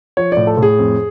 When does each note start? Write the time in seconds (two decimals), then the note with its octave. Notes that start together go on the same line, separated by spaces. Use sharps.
0.17 F3 C#5
0.32 A2 D5
0.47 A4
0.57 A2
0.62 G#4
0.79 F2